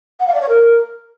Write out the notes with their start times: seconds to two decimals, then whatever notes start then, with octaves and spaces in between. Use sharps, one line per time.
0.20 F#5
0.27 F5
0.34 D5
0.42 C#5
0.49 A#4